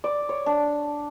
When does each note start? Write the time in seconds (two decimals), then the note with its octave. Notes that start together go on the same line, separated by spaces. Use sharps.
0.04 D5
0.29 C#5
0.46 D4